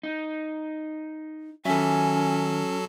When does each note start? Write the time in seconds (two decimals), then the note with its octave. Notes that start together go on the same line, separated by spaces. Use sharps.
0.03 D#4
1.65 D#3 F#3 C#4 A4 E5 G#5